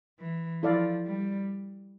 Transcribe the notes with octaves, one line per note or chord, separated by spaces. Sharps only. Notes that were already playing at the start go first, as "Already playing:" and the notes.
E3
F3 E4 A4 D5 F5
G3